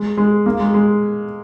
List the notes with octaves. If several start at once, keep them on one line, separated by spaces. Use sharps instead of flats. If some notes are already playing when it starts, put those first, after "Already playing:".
Already playing: G#3
G#3
A#3
G#3
G#3